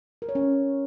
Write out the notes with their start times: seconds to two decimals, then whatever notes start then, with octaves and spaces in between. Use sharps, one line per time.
0.22 A#4
0.29 C#5
0.35 C#4